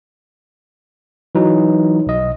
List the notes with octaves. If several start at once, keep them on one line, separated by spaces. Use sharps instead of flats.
E3 F#3 D#4
B1 D#5